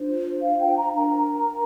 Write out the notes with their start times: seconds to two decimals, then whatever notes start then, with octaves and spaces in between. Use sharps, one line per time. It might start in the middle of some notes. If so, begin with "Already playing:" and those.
Already playing: D4 F4 C5
0.43 F5
0.60 G5
0.76 A#5
0.93 D4 A#4 A#5